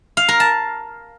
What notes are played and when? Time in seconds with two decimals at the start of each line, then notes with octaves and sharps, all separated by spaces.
0.17 F5
0.28 A#4
0.40 A5